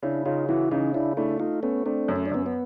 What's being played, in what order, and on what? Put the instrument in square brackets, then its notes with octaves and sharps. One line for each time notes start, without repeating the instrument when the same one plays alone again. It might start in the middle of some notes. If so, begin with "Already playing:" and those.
[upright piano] C#3 [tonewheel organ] D4 E4
[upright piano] C#3 [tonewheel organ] D#4 F4
[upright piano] E3 [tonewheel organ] E4 F#4
[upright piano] C#3 [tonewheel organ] C#4 D#4
[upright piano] C#3 [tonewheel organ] D4 E4
[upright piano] A3 [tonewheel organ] D4 E4
[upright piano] A3 [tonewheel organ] D#4 F4
[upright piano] A3 [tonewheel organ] B3 C#4
[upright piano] A3 [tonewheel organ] C4 D4
[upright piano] F#2
[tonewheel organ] C#4
D4
[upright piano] F#2 [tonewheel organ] B3 C#4
[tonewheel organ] B3